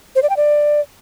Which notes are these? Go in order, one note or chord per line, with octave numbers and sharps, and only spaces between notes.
C5
D5
G5
D5